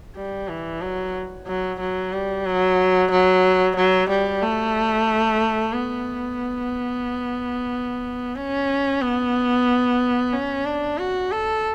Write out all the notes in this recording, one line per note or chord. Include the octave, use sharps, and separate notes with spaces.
G3
E3
F#3
F#3
F#3
G3
F#3
F#3
F#3
G3
A3
B3
C#4
B3
C#4
D4
F#4
A4